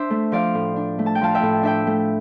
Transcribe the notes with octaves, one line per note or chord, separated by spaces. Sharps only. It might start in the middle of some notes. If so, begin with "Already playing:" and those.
Already playing: D4 C5 E5
A3
F3 D5 F5
A2
D4
A3
A5
G5
F3 F5 A5
E5 G5
A2
D4 E5 G5
A3